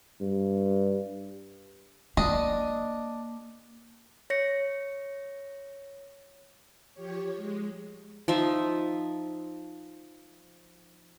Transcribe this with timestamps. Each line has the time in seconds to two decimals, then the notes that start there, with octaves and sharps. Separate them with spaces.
0.21 G2
2.17 A#3 D4 D#5
4.30 C#5 A#6 C#7
6.94 F3 G4 C#5
7.35 G#3
8.28 F3 D#4 E5